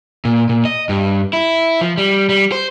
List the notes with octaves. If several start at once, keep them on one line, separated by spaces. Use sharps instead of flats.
A#2
A#2
D#5
G2
E4
F3
G3
G3
C5